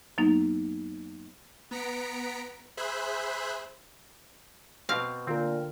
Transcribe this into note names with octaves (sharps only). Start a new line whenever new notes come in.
F#2 F#3 A#3 B3 D#4
B3 A#5 B6 C#7 D7
G#4 C5 E5 B5 F#6
B2 C4 F5
A#2 D3 C4 F4 A#4